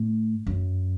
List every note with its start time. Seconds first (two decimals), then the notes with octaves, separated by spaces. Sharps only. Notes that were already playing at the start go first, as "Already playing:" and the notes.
Already playing: A2
0.47 F#2